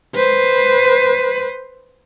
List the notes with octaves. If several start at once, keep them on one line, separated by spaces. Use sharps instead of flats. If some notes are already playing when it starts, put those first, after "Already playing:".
B4 C5